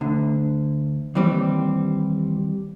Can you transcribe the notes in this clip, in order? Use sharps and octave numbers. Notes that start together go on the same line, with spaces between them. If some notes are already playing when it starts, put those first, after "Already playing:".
D2 D3
D#2 E3 G3 C4